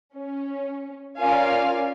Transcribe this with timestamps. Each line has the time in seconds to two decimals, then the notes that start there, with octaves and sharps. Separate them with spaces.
0.15 C#4
1.18 C#4 F4 A#4 D5 F5 G#5